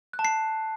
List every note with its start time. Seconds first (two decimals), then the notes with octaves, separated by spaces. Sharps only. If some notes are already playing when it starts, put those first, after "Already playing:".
0.13 F#6
0.19 A5
0.25 C7